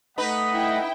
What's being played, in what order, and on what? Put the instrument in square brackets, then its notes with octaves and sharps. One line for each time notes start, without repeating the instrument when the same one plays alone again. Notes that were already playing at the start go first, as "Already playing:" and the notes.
[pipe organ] A3 B5 [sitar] D#4 B4 [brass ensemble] D#5 F#5
[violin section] E4 G5